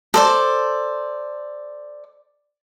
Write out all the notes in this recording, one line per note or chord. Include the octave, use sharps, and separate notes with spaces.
A4 C5 D5